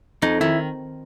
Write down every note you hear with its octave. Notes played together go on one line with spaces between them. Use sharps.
F2 D#4
D#3 E4